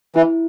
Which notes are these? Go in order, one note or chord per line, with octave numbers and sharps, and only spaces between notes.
E3 E4